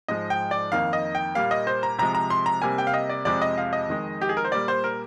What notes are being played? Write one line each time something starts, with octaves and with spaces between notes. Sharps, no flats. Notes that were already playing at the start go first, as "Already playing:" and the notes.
G#2 F3 G#3 D#5
G5
D5
F2 D#3 A#3 F5
D#5
G5
A#2 G3 A#3 F5
D#5
C5
A#5
C3 F3 G#3 A#5
A#5
C6
A#5
C3 G3 A#3 G#5
G5
F5
D#5
D5
F2 C3 F3 G#3 D5
D#5
F5
D#5
F2 D#3 G#3
G4
G#4
A#4
C5
A#2 G3 A#3 D5
C5
A#4